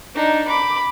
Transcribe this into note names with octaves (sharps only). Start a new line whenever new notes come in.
D4 D#4
B5 D6